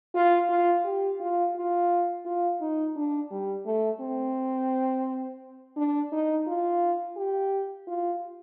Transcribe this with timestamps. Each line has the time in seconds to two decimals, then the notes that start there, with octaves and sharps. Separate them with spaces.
0.14 F4
0.49 F4
0.85 G4
1.20 F4
1.56 F4
2.26 F4
2.61 D#4
2.96 D4
3.31 G3
3.66 A3
4.01 C4
5.77 D4
6.12 D#4
6.47 F4
7.17 G4
7.87 F4